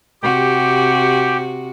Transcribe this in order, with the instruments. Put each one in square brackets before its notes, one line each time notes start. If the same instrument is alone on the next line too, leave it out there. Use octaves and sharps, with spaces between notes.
[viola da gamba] C3 F#4 [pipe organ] G4